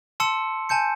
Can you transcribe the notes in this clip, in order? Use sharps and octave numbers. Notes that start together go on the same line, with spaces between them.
A5 C6 E6 C#7
G#5 A5 G6 C#7